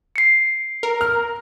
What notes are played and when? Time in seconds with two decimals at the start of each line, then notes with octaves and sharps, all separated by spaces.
0.16 C7 C#7
0.83 A#4
1.01 F6